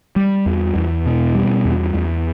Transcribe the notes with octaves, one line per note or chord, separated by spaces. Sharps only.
G3
E2
E2
B2
G3
E2
E2